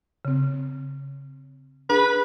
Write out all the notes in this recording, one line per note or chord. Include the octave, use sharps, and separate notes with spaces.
C#3 C4
D4 G#4 B4